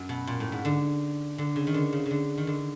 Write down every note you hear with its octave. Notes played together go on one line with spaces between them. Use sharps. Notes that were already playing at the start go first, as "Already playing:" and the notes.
Already playing: F#2
B2
A#2
A2
G#2
D3
D3
C#3
D#3
D3
C#3
C#3
D3
D#3
D3